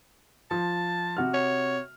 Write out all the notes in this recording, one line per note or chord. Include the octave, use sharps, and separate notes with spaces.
F3 A5
C3 F#4 F6
C#5